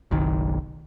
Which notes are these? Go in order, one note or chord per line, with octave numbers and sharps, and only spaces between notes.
F#1 B1 D#3